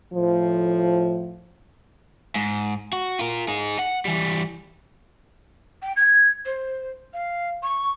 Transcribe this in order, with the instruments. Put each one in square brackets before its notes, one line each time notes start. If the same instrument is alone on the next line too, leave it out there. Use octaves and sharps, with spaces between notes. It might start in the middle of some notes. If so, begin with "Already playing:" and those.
[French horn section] A2 F3
[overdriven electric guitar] G#2
F#4
F4 A#4
D#4 G#4
F#5
E3 G3
[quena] G5
G#6
C5
F5
C#6